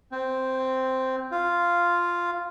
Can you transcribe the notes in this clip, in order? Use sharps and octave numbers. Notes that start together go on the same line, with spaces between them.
C4
F4